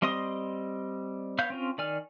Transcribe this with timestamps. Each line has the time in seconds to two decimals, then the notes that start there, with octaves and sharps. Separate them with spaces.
0.02 G3 C4 D#5 C6 D#6
1.39 B3 C#5 F5 G6
1.50 C4 C#4 F4
1.78 D#3 D5 G#5 F6